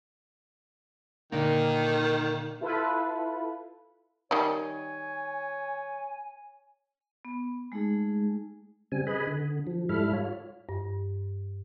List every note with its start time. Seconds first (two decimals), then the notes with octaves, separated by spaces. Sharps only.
1.32 A#2 D3 D#3 A#3
2.61 E4 F4 A4 B4
4.31 D#3 G3 C#5 G#5
7.25 B3
7.72 G#3 A3 D#4 G#4
8.92 C#3 G3 C4 G#5
9.07 G#4 B4 D#5 G#5 B5
9.27 D3
9.67 F3
9.89 G#2 G3 E4 A4 B5 F6
10.13 F4 C#5
10.69 G2